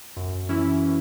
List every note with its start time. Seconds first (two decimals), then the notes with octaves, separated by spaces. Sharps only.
0.17 F#2
0.49 E3 C#4 E4